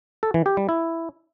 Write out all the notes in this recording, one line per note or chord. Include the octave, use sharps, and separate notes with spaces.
A4
E3
G4
G3
E4